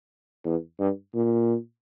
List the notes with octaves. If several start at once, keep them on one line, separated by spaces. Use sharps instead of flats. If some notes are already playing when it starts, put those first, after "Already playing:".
E2
G2
A#2